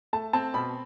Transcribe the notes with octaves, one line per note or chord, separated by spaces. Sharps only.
A3 A5
C4 A5
B2 B5